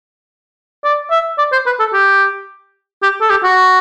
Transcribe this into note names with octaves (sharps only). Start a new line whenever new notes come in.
D5
E5
D5
C5
B4
A4
G4
G4
A4
G4
F#4